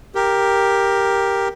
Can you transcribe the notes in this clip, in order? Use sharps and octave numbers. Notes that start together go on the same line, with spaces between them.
G4 A#4